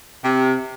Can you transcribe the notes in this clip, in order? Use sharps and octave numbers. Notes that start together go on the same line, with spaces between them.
C3